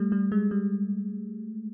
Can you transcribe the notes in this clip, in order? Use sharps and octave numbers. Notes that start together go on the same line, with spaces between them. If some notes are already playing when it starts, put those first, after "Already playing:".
Already playing: G3 A3
G3
G#3
G3